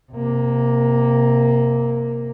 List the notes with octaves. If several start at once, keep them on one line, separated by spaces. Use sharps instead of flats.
C3 A#3